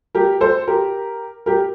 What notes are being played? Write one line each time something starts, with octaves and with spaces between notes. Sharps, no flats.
G4 A#4
A4 C5
G4 A#4
G4 A#4